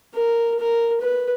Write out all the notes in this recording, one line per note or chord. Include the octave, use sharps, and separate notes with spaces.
A#4
A#4
B4